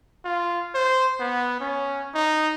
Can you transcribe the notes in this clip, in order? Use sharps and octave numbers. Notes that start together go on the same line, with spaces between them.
F4
C5
B3
C#4
D#4